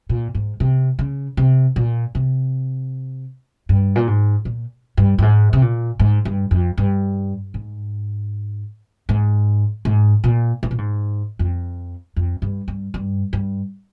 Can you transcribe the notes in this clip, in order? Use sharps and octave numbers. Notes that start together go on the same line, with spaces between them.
A#2
G#2
C3
C#3
C3
A#2
C3
G2
A#2
G#2
A#2
G2
G2
G#2
C3
A#2
G#2
G2
F2
G2
G#2
G#2
G#2
A#2
G#2
A#2
G#2
F2
F2
G2
G2
G2
G2